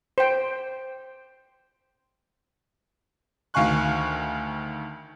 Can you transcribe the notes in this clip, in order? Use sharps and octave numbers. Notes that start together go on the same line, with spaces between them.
C5 G5
D2 D#3 F5 G#5 C#6 F#6